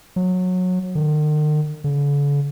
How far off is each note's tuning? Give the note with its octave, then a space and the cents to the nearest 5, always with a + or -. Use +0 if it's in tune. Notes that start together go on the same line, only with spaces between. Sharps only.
F#3 -20
D#3 -45
D3 -45